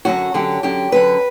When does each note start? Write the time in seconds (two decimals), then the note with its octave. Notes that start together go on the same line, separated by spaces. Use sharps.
0.05 F#2 D3 F#3 F#4
0.34 F#2 D3 F#3 G4
0.63 F#2 D3 F#3 G4
0.92 F#2 D3 F#3 B4